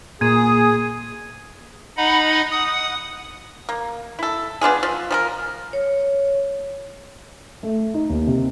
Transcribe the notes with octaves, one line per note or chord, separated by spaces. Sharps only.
A#2 G#4 G#6 D#7
D#4 D#5 F#5 B5
F#5 D#6
A#3
E4 A4
B3 D4 F4 G#4
F3
F3 G#4 A#4
C#5
A3
D#4
D#2
C3